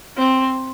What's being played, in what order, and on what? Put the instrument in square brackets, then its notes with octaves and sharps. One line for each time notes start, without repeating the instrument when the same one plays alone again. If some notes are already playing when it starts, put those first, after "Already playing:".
[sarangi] C4